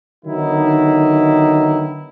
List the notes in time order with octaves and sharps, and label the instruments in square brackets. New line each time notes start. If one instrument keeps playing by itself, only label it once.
[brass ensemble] D3 D#3 F#3 B3 D#4 E4